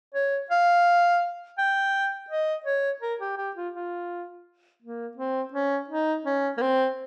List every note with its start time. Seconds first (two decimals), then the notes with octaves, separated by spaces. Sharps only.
0.14 C#5
0.51 F5
1.58 G5
2.30 D#5
2.66 C#5
3.02 A#4
3.20 G4
3.38 G4
3.56 F4
3.75 F4
4.82 A#3
5.17 C4
5.53 C#4
5.89 D#4
6.26 C#4
6.57 A#3
6.61 C4